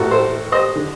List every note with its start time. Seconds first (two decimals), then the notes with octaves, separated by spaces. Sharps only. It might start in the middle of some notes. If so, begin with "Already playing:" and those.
Already playing: A1 A2 F#4 A4 A#4
0.11 A4 C5
0.52 C5 D#5
0.76 D3